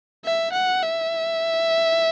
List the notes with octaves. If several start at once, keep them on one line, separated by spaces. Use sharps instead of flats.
E5
F#5
E5